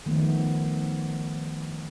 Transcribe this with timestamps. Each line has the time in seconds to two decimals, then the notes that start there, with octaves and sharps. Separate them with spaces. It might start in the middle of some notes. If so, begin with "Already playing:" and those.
0.06 D#3 F3 A3 B3